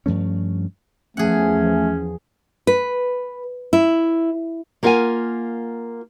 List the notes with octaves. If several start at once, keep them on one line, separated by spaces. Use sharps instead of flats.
G2 F3 A3 C#4
E2 F3 A3 C#4 G#4 F#5
B4
E4
A#3 F4 A#4 C#5 F#5 G#5